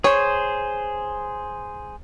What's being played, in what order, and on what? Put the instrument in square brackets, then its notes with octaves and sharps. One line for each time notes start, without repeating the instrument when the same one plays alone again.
[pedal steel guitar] G#4 C5 [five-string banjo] C#5